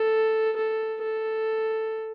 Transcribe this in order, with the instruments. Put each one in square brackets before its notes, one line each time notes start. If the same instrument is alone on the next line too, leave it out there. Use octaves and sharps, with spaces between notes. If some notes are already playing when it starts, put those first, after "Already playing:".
Already playing: [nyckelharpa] A4
A4
A4